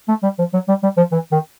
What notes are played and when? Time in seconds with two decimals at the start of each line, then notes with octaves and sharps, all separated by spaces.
0.08 A3
0.23 G3
0.39 F3
0.53 F#3
0.68 G3
0.83 G3
0.97 F3
1.12 E3
1.32 D#3